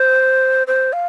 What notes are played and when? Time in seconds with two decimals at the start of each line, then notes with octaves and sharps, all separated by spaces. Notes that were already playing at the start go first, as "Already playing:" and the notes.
Already playing: C5
0.67 C5
0.93 F5